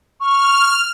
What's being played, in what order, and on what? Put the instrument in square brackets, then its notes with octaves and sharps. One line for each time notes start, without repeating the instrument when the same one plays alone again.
[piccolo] C#6 [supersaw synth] F6